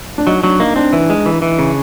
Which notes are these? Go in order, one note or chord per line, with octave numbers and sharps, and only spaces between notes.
D4
F#3 D#4
F#3 D4
A#3 D#4
C4 D4
E3
G#3
E3
E3
C#3